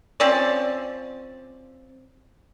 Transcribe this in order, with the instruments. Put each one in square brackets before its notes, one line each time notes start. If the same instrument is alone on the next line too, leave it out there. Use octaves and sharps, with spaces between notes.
[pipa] F3 C4 C#4 D5